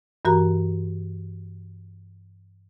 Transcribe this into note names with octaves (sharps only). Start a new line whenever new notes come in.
G2 E3 F#4 A#4 A#5